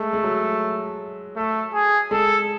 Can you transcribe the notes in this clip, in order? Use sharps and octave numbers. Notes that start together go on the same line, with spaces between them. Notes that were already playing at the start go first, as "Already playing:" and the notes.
Already playing: G#3 A3
G#3
F#3
A3
G#4
G#3 A4